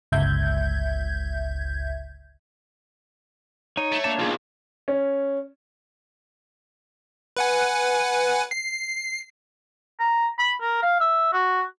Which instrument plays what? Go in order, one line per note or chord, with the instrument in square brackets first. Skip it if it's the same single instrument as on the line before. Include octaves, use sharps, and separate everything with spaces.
[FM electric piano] G1 C#2 E5 G6 G#6
[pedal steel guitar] D#4 [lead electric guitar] C#5
[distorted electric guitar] A3
[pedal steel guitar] A#3 D4 A5
[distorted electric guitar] B1 [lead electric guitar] F4 G#4
[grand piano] C#4
[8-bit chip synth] B4 F#5 G#5
C7
[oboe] A#5
B5
A#4
F5
E5
F#4